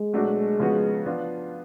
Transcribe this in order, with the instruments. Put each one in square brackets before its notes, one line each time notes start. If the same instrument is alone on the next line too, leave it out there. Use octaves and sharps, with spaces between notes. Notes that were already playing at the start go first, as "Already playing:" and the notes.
Already playing: [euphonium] G#3
[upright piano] B2 F#3 A3 D4 F#4
C#3 F3 B3 F#4
F3 B3 D4 F4